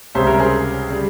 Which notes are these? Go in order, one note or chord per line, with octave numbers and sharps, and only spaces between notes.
C#2 C3 G3 C#4 C5 E5
A#4 C#5
G#4 C5
C#3 G3